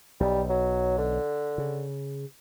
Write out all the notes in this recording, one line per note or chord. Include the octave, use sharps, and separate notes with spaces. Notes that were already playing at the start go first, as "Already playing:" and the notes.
B1 G3
F#3
D3
C#3